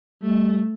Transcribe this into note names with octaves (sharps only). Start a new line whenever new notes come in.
G3 A3